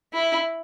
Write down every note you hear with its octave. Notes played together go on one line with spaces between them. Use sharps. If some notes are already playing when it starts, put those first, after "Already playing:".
E4